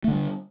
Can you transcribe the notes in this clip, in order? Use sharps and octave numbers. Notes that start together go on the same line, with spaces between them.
D3 G3 A3